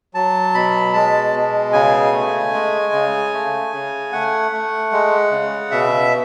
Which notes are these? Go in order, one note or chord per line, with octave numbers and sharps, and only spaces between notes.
F#3 A5
B2 B5
G#3 A5
B2
C#3 G#5
A3
G#3
C#3
A3
C#3
A3 F#5
A3
G#3
C#3
B2 E5